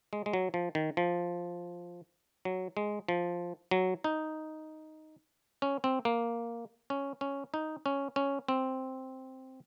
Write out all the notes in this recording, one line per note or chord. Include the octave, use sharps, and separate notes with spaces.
G#3
G#3
F#3
F3
D#3
F3
F#3
G#3
F3
F#3
D#4
C#4
C4
A#3
C#4
C#4
D#4
C#4
C#4
C4